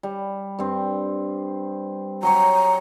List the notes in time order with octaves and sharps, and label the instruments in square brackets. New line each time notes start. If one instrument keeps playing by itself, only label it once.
[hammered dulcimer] G3
G2 C4
[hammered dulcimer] F#3 G4 C#5 [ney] A#5